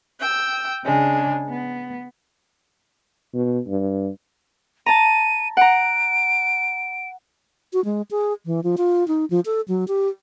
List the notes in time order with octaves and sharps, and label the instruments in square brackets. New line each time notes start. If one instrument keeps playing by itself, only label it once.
[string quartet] G5 E6
C#3 G#3 D4
B3
[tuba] B2
G2
[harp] A5 A#5 [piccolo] D#7
[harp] F#5 A#5 [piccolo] D7
[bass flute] F#4
G#3
G#4
E3
F3
F4
D#4
F3
A4
F#3
G4